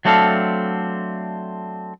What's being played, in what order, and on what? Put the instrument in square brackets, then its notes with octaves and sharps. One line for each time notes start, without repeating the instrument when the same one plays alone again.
[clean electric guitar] F#3 A3 C4 D4 A4 F5